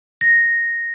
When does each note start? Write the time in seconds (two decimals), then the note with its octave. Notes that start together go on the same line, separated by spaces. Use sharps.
0.21 A#6